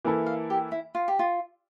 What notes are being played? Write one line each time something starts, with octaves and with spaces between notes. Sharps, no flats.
E3 A#3 E4 A4
F5
G4
E4
F4
G4
F4